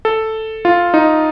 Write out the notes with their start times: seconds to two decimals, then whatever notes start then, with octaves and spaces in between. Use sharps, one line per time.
0.05 A4
0.65 F4
0.94 D#4